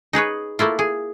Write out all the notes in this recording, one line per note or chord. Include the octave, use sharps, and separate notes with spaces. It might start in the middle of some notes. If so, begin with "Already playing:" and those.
D#4 G#4 B4 C#5
A3 A#3 E4 F4
G#4